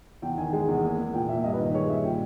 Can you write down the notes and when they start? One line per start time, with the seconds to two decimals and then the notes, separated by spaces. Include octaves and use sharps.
0.22 E2 G5
0.38 D#3 G#5
0.53 G#3 G#5
0.68 E2
0.83 A#3
0.98 A#3
1.13 A#2 G5
1.28 A#2 E5
1.44 G2 D#5
1.53 B4
1.59 D#3
1.74 G#3 C#5
1.89 G2 E5
2.04 A#2 G5